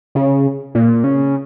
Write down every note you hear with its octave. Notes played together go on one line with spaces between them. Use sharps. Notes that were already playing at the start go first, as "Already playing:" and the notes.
C#3
A#2
C#3